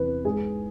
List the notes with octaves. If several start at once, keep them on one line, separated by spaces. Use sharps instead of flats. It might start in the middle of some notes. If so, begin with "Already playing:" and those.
Already playing: E2 C3 E3 B4
G#2 G#4